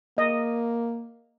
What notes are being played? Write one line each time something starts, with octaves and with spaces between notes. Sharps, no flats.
A#3 D#5